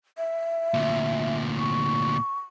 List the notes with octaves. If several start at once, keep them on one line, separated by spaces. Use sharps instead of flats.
E5
D2 A#2
C#6